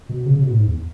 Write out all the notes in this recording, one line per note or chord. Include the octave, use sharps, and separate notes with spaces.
B2
C#3
C#3
B2
A2
G#2
E2